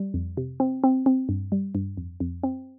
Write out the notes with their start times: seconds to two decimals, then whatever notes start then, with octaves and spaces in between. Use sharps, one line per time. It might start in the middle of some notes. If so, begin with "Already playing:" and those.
Already playing: G3
0.14 F2
0.37 C3
0.60 C4
0.84 C4
1.06 C4
1.29 G2
1.52 G3
1.75 G2
1.97 F2
2.20 F2
2.43 C4